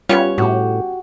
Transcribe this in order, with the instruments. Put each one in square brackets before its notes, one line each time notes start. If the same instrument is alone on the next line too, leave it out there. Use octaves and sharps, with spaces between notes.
[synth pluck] G3 F4 [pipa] B3 C#4 C#5
[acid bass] A2 [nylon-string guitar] F#4 G4